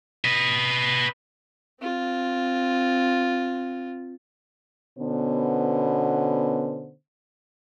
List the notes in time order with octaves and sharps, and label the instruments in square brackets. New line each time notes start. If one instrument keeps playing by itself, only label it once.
[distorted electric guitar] B4 D#5
[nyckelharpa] C4 F4
[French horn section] B2 D3 B3 C#4 C5